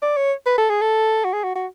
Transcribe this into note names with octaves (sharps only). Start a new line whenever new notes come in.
D5
C#5
B4
A4
G#4
A4
F#4
G#4
F#4
F#4